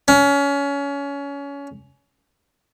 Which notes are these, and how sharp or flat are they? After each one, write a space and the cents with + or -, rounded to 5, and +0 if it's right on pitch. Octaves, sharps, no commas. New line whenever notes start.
C#4 +25